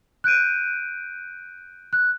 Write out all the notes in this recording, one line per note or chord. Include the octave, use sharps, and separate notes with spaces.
F#6 G6 D7 D#7
F#6